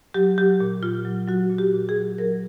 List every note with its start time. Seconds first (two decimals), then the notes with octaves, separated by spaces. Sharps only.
0.14 F#3 G4
0.38 F#3 G4
0.60 A#2
0.83 A#2 F4
1.05 F#3
1.28 F#3 F#4
1.50 A#2
1.58 G4
1.74 A#2
1.89 G#4
1.96 F#3
2.18 F#3 A#4